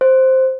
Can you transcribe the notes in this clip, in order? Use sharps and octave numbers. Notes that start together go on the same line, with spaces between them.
C5